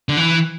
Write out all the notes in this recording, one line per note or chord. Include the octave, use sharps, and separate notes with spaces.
D3
E3